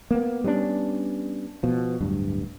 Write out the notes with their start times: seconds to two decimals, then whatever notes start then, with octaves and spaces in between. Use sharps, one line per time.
0.11 A#3 B3
0.44 G3 B3 C#4 D4
1.63 B2 F3
2.00 D1 G2